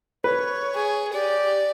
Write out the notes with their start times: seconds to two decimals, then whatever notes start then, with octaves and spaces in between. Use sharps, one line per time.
0.24 B4 C#5
0.75 G#4
1.13 G4 D5